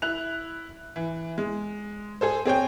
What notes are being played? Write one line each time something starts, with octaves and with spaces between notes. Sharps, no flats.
E4 F#6 F7
E3
G#3
G#4 A4 C5
C4 G#4 C#5 G5